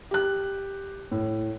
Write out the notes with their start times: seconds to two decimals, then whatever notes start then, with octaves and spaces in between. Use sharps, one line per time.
0.11 G4 F#6
1.11 A2